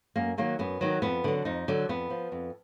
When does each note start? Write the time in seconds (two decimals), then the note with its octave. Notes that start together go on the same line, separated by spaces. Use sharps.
0.16 F#2 A#3
0.38 D#3 F#3 A#3
0.59 F#2 B3
0.81 D#3 F#3
1.02 F2 B3
1.24 D3 F#3
1.45 F2 D#4
1.68 D3 F#3
1.89 F2 B3
2.10 F3
2.32 F2